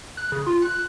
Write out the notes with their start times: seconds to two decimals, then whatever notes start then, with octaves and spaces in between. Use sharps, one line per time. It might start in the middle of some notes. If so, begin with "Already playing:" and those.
0.17 F#6
0.32 C#3
0.46 F4
0.62 F#6